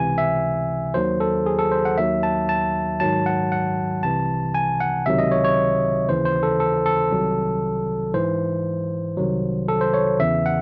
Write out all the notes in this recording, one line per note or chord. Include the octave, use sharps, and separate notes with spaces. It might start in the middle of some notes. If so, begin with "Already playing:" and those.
Already playing: C#2 C3 E3 G#5
E5
D#2 D#3 F#3 C5
A4
G#4
A4
C5
F#5
D#2 D#3 F#3 E5
A5
A5
G#2 D#3 F#3 A5
F#5
F#5
C2 C3 E3 A5
G#5
F#5
C#2 C3 D#3 F#3 E5
D#5
C#5
C#5
D#2 C#3 E3 C5
C5
A4
A4
A4
C2 C3 D#3 F#3
G#2 E3 C5
C2 C3 D#3 F#3
A4
C5
C#5
E2 C#3 E3 E5
F#5